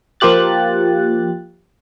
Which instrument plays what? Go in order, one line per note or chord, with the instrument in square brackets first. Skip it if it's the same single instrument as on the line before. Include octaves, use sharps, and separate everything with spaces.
[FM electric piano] F3 A#3 F4 G4 F#6 A6